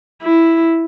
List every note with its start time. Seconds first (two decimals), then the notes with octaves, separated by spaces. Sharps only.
0.23 E4